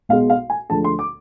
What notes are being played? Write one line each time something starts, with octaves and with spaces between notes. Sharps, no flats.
B1 B2 G#3 F5
F5
G#5
D2 D3 F3 G#3 A5
C6
D6